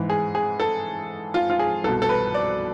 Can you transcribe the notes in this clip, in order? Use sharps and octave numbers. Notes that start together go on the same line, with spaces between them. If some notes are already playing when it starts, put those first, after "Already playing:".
Already playing: G#2 E3
G#4
G#4
A4
F4
F4
G#4
C2 B2 A4
A4
B4
D5